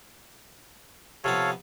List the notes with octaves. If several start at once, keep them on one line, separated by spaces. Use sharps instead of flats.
C3 F3 B3 A4 C#5 F5